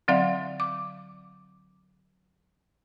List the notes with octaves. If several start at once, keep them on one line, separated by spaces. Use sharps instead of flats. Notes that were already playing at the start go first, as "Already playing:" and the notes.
D3 F#3 C4 D5 E5 F5
D6